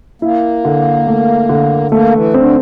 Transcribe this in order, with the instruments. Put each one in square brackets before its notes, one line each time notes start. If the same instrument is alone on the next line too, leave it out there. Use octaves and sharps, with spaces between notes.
[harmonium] A#3 [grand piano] E4
[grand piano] D3
A3
D3
[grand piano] A3 [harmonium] A#3
[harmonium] E3
[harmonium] D3 [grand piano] C4